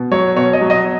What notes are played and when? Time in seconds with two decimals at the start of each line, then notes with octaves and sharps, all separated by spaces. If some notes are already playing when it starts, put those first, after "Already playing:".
Already playing: B2
0.11 F#3 C#5
0.37 B2 C#5
0.53 D#5
0.61 F#3
0.70 D#5